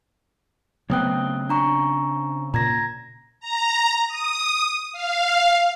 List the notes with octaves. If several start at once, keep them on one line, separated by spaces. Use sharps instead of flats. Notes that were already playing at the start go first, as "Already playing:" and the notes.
C#3 F#3 A3 B3 C4 G5 D#6 F#6
D4 A#5 C#6
A#2 A#5 G#6 A#6
A#5
D#6
F5